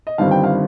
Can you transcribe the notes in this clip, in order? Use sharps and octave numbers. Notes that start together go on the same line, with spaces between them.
D#5
G1 G2 D#3 G3 C4 F5
G5
F5